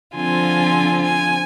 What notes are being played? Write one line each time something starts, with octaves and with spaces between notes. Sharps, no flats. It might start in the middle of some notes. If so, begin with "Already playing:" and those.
D3 F3 C4 F4 G#5
G#5